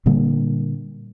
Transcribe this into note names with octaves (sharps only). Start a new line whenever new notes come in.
A#2 D3 G3 A#3